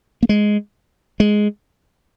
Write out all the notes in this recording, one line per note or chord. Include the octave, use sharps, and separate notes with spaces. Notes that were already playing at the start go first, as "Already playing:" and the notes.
A#3
G#3
G#3